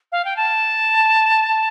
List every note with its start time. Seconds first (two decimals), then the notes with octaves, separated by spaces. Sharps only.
0.12 F5
0.25 G5
0.36 A5